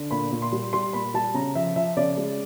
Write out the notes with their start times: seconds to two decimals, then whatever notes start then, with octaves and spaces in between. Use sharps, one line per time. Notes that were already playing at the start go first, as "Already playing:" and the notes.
Already playing: D3
0.11 A#2 B5
0.32 A#2
0.42 C6
0.52 G3
0.73 G3 C6
0.93 A#2 B5
1.14 G3 A5
1.34 C#3 A#5
1.55 F3 E5
1.76 F3 E5
1.97 C#3 D5
2.17 G#3